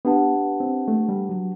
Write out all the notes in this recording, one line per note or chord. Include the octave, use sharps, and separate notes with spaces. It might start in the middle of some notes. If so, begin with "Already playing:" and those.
B3 D4 G4 B4 F#5 A5
C4
A3
G3
F#3